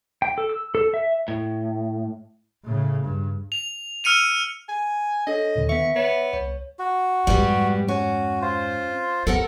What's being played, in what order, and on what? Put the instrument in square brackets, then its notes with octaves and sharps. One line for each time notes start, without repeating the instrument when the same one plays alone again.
[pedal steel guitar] G5
A4
E6
A4
E5
[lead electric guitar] A2
[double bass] A2 C#3
G2
[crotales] F7
E6 F6 C#7 D#7 F7
[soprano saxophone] G#5
[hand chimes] D4 A4 C#5 [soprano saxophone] D#5
[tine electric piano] D#2 A#2 D3
[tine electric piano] D#3 B3 [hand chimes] E5 B6 [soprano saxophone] C#6
[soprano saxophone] B3 [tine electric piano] C#5
[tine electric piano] C2 [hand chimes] C#5
[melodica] F#4
[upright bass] F2 G#2 [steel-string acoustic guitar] G3 B3 G4
[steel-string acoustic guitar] C#4 [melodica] F#4
[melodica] F4 C5
[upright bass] B3 [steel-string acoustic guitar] A4 A#4 F#5